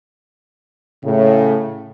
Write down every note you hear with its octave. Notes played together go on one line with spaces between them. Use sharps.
A2 C#3